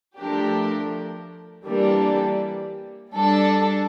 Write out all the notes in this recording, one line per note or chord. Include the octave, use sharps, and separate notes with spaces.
F3 A3 D4 G4 A#4
E3 G3 A#3 D4 A4
G3 D4 A4